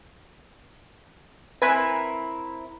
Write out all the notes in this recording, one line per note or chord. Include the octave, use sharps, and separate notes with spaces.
C4 E4 A#4 B4 G#5